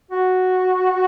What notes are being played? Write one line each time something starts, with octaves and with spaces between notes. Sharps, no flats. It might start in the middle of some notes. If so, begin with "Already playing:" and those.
F#4